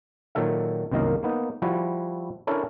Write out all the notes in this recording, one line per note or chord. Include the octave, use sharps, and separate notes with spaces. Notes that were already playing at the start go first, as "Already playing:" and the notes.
A#2 D#3 F#3 A4 E5
C2 F#2 D#3 A#3 D#5 F5
A#3 B3 D#4
F3 G3 E4 F#4
C#4 D4 E4 A4 A#4